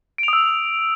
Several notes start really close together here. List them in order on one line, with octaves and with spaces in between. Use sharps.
D7 F7 D#6 E6